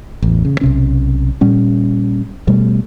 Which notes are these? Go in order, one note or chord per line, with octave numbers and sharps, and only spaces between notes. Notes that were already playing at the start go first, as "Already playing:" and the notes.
A1 E2
C#3
B1 C3 C#4
A#2 G3 C#4
B2 G3 A3